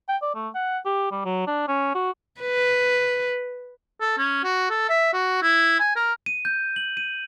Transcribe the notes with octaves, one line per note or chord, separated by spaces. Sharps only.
G5
D5
A3
F#5
G4
G3
F#3
D4
C#4
F#4
B4
A4
C#4
F#4
A4
E5
F#4
E4
G#5
A#4
D#7
G6
F#7
D#7